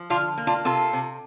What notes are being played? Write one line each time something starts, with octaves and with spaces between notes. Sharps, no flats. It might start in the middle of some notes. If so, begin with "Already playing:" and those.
Already playing: F3
D3 D4 F4
A#3
D4 F4
C3 F4 A4
C3